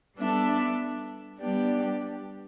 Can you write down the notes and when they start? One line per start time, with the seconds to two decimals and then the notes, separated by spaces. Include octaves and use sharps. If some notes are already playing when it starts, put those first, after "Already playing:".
0.17 G3 B3 D4 A4 E5
1.39 G3 B3 D4 G4 D5